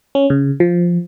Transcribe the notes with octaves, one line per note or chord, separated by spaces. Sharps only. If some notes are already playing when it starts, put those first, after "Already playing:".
C#4
C#3
F3